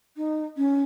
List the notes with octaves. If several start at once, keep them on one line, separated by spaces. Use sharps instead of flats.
D#4
C#4